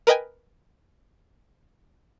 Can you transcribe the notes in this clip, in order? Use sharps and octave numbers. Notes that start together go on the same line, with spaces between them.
A#4 B4 D#5 G5 G#5